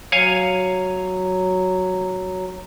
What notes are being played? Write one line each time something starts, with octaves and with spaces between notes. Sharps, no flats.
F#3 C#5 F5 G#5